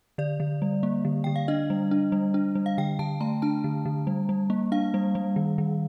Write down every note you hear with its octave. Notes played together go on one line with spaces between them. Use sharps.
D3 D5
D3
G3
A#3
D3
D3 G5
F5
D4 D#5
G3
D4
G3
D4
G3
F5
D3 G5
D3 A5
A3 A#5
D4 A5
D3
D3
G3
G3
A#3
D4 F5
G3
G3
D#3
D#3